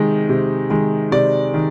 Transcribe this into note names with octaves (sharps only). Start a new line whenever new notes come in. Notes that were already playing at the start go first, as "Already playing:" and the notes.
Already playing: C3 D#3 G#3
C3
D#3 G#3
C3 D5
D#3